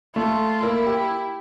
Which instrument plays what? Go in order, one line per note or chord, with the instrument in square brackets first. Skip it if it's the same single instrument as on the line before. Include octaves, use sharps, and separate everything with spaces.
[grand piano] A3 [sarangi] F4
[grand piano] A#3 [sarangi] E4
[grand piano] G4